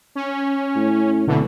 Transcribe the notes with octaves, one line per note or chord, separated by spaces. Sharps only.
C#4
A2
D1 B2 D3 E3